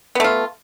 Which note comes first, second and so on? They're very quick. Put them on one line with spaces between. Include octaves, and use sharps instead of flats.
B3 A3 F4